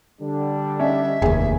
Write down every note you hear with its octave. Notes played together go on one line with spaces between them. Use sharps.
D3 G3 D4
C#4 D#4 E5
F1 D#2 G#4